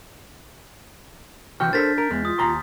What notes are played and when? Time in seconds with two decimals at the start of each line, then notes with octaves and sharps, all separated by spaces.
1.60 C3 E3 F#4 G5 F6 G6
1.73 D4 A4 A#4 C5 A6 B6
1.98 A#4
2.10 E2 G#3 B3
2.25 F4 D#6
2.39 D#2 A#5 C6